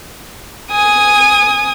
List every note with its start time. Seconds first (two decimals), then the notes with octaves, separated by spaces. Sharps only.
0.72 G#5 D#6